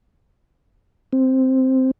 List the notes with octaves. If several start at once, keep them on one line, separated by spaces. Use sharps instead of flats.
C4